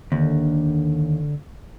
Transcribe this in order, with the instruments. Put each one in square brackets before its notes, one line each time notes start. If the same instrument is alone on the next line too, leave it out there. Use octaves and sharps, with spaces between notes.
[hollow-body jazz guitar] D#2 [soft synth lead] D3